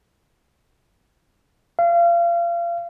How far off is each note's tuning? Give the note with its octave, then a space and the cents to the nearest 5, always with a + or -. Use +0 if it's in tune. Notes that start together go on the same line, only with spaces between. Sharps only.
F5 -30